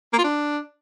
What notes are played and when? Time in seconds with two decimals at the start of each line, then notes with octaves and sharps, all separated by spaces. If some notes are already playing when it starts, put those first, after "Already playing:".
0.13 A#3
0.19 F4
0.24 D4